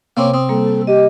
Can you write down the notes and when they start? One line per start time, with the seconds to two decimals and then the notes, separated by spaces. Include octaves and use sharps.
0.17 C3 A#3 C4 C#4 D6
0.34 C4 D#6
0.49 G3 A#3 A4
0.87 G4 D#5